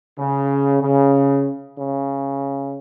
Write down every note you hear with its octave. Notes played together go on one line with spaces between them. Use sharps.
C#3
C#3
C#3